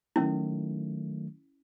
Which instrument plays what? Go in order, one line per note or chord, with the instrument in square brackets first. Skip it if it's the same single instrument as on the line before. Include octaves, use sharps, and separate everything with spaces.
[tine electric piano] D#3 F#3 A3 [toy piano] C#4 E4